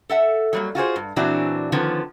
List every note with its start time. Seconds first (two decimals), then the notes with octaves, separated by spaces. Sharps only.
0.09 A4 E5 F#5
0.53 F#3 G3 A#3
0.75 F4 F#4 G#4 C5
0.96 G2
1.16 A#2 E3 F#3 C4 D4 F#4
1.72 D3 D#3 F3 B3 C#4